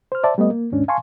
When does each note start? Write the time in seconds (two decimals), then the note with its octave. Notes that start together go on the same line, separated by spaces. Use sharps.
0.12 C5 F6
0.23 C5 D5 E5 A5
0.38 G3 A3 B3 D#5
0.50 A#3
0.72 D#2 G#2 C#4 D4
0.88 F5 G#5 A5 C6 C#6